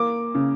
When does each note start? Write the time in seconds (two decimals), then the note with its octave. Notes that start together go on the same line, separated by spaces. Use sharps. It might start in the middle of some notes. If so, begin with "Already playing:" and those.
Already playing: A#3 D6
0.35 C#3